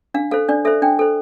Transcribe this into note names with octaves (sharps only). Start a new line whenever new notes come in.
D4 F5
A4 C5 F5
D4 D5
A4 C5 E5
D4 G5
A4 C5